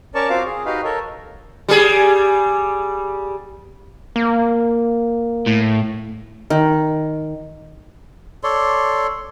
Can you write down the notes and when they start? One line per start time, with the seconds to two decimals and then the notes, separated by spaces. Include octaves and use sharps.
0.15 C#4 A#4 C#5 D5 A5 C#6
0.29 C4 F4 F#4 C5 F5 D6
0.45 G#4
0.66 D#4 F#4 G4 B4 F5
0.84 A4 A#4 C#5
1.69 G3 G#4
4.16 A#3
5.47 A2
6.50 D#3
8.43 A4 C#5 D5 C6